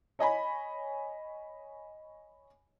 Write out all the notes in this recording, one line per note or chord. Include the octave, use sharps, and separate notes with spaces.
C#5 D#5 G#5 B5